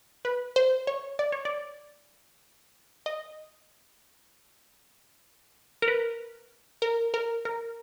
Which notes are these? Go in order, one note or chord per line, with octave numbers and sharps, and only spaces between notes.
B4
C5
C#5
D5
C#5
D5
D#5
A#4
B4
A#4
A#4
A#4